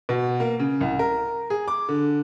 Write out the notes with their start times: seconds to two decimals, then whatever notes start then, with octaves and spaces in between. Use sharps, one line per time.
0.09 B2
0.40 A#3
0.59 C#3
0.81 C2
0.99 A#4
1.50 G#4
1.68 D6
1.89 D3